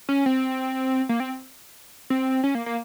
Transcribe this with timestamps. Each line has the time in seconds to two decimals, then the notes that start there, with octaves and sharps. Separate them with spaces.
0.09 C#4
0.26 C4
1.09 A#3
1.20 C4
2.10 C4
2.44 C#4
2.55 A#3
2.66 A#3